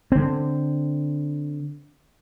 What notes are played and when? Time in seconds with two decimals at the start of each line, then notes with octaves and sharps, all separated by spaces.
0.12 D3 C4